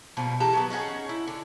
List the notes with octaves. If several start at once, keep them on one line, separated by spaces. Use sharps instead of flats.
B2 F3 G3 A#3
E3 G4 A4 A#5
F#3 A#3 B3
C#4 D#4 G#4 F#5
E4
D3